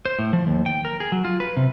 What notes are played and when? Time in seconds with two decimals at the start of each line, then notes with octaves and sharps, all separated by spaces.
0.05 C5
0.19 A2
0.33 F3
0.47 D#2
0.66 G5
0.85 A#4
1.00 G#4
1.12 F#3
1.24 F4
1.40 B4
1.57 C3